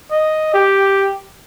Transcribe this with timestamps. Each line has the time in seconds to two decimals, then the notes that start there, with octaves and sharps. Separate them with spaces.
0.11 D#5
0.54 G4